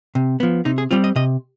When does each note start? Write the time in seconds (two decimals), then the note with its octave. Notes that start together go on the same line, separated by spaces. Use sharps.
0.15 C3
0.40 F3 B3
0.65 C3 D#4
0.78 G#4
0.91 G3 C4 F4
1.04 D#5
1.16 C3 D#5